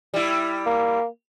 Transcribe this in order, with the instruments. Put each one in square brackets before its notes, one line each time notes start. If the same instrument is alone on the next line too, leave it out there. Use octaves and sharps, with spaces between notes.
[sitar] G3 E4
[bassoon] A#3